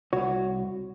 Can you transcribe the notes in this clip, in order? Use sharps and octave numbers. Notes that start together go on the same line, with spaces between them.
C2 F#4 C#5